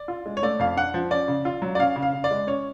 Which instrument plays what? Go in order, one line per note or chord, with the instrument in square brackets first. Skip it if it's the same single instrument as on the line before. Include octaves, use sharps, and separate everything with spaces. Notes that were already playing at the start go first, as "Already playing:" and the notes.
Already playing: [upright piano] D5
F4
G#3
C#5
A3 D5
F2 F5
D4 F#5
F3
C#4 D5
C#3
F4
F#3
D5
C#4 F5
C#3
F5
C#3
D5
G#3
C#4 C#5